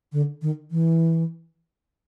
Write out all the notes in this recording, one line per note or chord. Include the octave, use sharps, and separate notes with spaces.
D3
D#3
E3